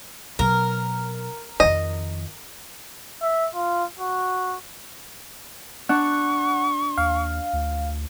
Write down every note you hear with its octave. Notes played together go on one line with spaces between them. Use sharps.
B2 F#3 A#4
F2 D#3 D#5
E5
F4
F#4
D4 F#5 C#6
D#2 F5
D2